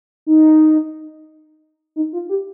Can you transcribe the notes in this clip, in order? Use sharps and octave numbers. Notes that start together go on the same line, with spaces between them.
D#4
D#4
F4
G4